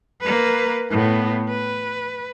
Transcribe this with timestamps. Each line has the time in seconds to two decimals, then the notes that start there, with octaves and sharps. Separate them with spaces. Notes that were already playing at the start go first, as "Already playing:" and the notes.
0.21 A#3 B4
0.91 A2 B3
1.49 B4